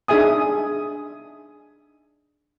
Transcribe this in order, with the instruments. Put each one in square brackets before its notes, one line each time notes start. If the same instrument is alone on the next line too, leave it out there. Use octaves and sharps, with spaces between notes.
[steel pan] D4 D#4 G#4 E5 G#5 D#6